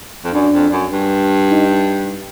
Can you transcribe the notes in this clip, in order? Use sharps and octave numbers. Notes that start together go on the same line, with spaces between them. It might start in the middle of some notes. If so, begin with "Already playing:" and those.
F2
F#2 D4
F2
F#2
G2
D#4